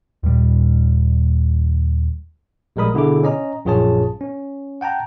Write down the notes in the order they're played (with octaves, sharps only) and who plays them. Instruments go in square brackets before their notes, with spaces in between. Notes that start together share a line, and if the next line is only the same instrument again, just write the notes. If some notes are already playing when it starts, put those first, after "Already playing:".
[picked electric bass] D#2 A#2 G3
[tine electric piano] A#1 G3 G#3 A#4 B5 D#6
B2 D3 E4 G#4 D6
C#4 D#5 A#5
A#1 F#2 F4 G#4 C#5 A5
C#4
F#5 G5 A5 A#5